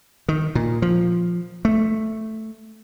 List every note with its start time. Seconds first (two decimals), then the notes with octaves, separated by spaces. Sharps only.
0.28 D#3
0.55 A#2
0.82 F3
1.65 A3